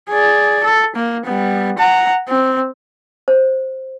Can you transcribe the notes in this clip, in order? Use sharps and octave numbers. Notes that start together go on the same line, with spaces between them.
G#4 D5
A4
A#3
G3 B3
F#5 A#5
C4
C5